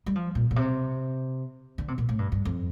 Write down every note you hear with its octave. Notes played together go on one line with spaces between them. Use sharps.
G3
F3
A#2
A#2
C3
D3
C3
A#2
A2
G2
G2
F2